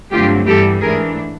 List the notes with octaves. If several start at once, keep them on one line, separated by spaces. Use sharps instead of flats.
G2 D3 F#3 A3 C4 F4 G4
G2 E3 G3 B3 G4 A4
G#2 E3 A3 D4 G#4 A#4